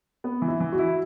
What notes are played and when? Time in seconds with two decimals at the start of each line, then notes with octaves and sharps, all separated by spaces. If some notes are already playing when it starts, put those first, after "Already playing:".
0.24 B3
0.42 E3
0.48 E4
0.60 E3
0.73 F#4
0.79 E4